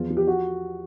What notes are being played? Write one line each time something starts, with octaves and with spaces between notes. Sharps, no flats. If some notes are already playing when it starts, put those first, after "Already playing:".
Already playing: E2 F3 F4
F3
G4
F#4